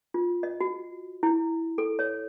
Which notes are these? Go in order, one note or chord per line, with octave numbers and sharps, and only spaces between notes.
F4
D#5
F#4
E4
A4
C#5